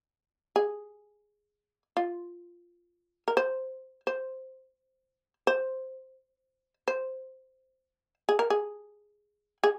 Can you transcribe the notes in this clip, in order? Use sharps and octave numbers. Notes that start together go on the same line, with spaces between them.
G#4
F4
A#4
C5
C5
C5
C5
G#4
A#4
G#4
G#4